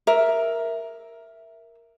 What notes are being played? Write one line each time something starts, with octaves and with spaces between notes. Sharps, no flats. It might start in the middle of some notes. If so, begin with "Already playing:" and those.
A#4 E5